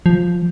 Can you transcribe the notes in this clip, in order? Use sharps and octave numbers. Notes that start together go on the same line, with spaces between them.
F3